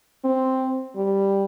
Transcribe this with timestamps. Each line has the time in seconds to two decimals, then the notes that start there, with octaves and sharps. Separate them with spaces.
0.24 C4
0.96 G3